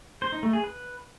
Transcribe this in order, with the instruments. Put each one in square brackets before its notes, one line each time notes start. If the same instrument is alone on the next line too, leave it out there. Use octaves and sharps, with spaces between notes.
[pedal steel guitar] C5
D#4
A3
G#4
B4